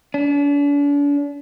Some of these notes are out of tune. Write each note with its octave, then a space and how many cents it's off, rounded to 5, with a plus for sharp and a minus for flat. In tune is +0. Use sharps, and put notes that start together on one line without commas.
D4 -40